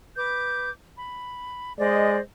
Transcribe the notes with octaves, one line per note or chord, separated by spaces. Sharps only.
B4 D6 G6
B5
G#3 C5 D5 D#5